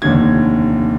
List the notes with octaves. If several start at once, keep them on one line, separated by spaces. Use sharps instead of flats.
F1 D#2 D3 G#6